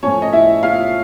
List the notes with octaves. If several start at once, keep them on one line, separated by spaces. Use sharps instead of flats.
A2 F3 C#4 C#5
D#5
E4 E5
F4 F5